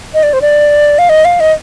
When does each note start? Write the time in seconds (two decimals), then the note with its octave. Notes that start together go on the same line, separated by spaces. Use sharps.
0.14 D#5
0.23 D5
0.33 C5
0.42 D5
0.99 F5
1.09 D#5
1.25 F5
1.40 D#5